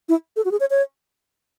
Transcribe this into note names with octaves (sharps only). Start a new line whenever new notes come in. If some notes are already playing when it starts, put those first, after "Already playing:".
E4
A4
F#4
G#4
C#5
C#5